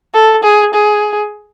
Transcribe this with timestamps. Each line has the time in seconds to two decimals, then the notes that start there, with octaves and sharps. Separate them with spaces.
0.14 A4
0.43 G#4
0.74 G#4